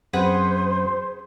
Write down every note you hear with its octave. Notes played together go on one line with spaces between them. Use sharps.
F#2 C4 G#4 B4 C5 F#5